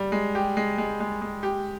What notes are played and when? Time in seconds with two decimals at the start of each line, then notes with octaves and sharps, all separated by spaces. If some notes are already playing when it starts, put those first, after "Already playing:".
Already playing: G3
0.12 G#3
0.35 G4
0.57 G#3
0.78 G#3
1.00 G#3
1.22 G#3
1.43 G4